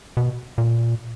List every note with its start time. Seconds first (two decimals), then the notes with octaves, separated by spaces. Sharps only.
0.17 B2
0.58 A#2